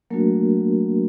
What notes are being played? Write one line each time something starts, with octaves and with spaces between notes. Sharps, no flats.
F#3 A3 A#3 D4 F#4 A#4